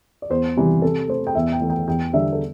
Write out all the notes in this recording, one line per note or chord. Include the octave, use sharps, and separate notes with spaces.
D5
E2 C5
C3 E3 G3
C3 A4
A3 C5
G5
E2 E5
G5
E3 A3
G5
E2 G5
D3 G3 E5
A4